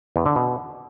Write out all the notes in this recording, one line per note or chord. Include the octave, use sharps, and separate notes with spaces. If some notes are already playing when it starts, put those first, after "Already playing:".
E2
D3
B2